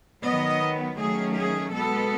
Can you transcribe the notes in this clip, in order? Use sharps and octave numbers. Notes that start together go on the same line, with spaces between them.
D#3 F#3 B3 D#5
D#3 F#3 A3 C#4 G#4
G#4
B2 G#3 B3 A4